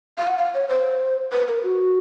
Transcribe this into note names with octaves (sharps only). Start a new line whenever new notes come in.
F5
F#5
F5
C#5
C5
B4
A#4
F#4